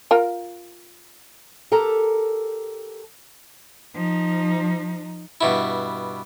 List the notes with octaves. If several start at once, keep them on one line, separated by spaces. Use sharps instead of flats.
F4 A#4 G5
G4 A4 A#4 A5 A#5
F3 D#4
G2 B2 E4